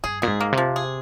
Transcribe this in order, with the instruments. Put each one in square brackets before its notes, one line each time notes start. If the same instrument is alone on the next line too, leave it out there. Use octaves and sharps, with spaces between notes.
[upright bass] G2 [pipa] G#4
[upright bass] A#2 [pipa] G#4
[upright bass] G#2
[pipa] A#3
[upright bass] C3
[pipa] F3
G#4